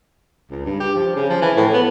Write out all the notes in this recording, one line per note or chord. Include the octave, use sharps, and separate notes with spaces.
C#2
G2
G4
F3
C#3
F3
E3
A2
B3